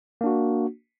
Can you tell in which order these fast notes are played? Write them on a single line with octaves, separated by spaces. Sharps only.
A#3 D4 F#4